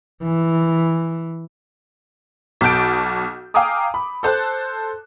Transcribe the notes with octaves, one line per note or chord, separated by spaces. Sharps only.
E3
B1 B2 A5 G6 D7
F5 G5 G#5 A#5 D6 D#6
B5
A4 C5 A5 F#6